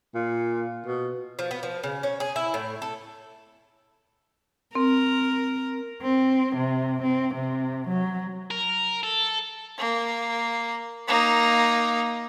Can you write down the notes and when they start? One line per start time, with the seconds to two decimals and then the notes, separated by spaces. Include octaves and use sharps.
0.15 A#2
0.87 B2
1.39 F3
1.51 B3
1.63 F3
1.83 C#3
2.03 C#4
2.20 G#4
2.36 E4
2.54 A2
2.82 A4
4.75 C4 A#4
6.03 C4
6.56 C3
7.03 C4
7.35 C3
7.88 F#3
8.51 A#4
9.03 A4
9.78 A#3
11.08 A#3 D#4